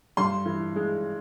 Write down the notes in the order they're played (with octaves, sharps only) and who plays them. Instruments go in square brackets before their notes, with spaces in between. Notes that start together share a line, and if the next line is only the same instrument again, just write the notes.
[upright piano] G2 C6
E3
G#3